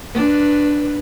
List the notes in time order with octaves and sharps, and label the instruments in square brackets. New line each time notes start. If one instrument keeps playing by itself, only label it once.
[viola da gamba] D4 B4